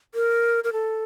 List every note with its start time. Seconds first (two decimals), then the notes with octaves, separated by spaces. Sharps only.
0.15 A#4
0.64 A#4
0.73 A4